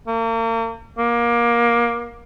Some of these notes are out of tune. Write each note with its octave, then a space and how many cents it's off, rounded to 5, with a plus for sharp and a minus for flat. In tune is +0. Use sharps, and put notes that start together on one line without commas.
A#3 -40
A#3 +20